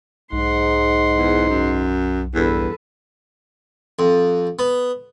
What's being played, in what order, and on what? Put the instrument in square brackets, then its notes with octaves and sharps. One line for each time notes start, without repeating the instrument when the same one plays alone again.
[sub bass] B1 [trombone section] G#2 D#4 [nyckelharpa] F#5 C6
[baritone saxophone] E2
F#2
[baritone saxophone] E2 [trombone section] G2 [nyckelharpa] A4 B4
[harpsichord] F2
B3